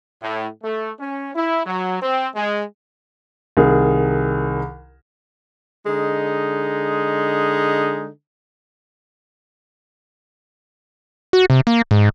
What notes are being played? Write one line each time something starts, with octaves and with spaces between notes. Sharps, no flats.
A2
A3
C#4
E4
F#3
C4
G#3
C2 D#3 G#4 A#4
D3 G#3 D#4
F#4
C3
A#3
G#2